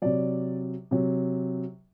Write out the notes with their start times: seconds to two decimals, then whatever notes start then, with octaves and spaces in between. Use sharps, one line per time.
0.02 C3 F#3 D5
0.91 C3 F#3